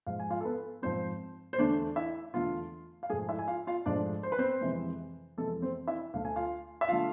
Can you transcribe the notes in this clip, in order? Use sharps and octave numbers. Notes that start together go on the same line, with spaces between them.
G#2 F3 G#3 F5
G#5
F4 F5
A4
B3 B4
G#2 F3 G#3 C4 C5
C5
E2 D3 A3 D4 D5
E4 E5
E2 D3 A3 F4 F5
F5
G#2 F3 A3 G#4 G#5
E4 E5
G#5
F4 F5
F4 F5
G#2 F3 A3 D4 D5
C5
B4
C4 C5
F2 C3 E3 G#3
F2 C3 E3 G#3 A4
C4 C5
E4 E5
D2 D3 A3 F5
G#5
F4 F5
E5
D3 A3 F4 F5